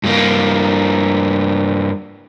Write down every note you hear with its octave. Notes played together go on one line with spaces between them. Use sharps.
G2 A#3